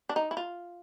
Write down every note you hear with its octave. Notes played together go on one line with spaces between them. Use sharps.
D4
D#4
E4
F4